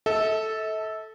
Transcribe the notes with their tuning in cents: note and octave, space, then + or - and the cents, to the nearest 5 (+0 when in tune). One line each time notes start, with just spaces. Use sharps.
A4 -5 E5 -45